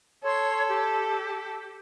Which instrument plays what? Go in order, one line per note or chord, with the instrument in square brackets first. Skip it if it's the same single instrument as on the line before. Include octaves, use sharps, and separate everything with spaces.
[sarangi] A4 [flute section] C#5 C6
[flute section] G4